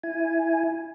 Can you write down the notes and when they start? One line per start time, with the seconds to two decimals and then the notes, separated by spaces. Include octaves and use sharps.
0.03 E4 G#5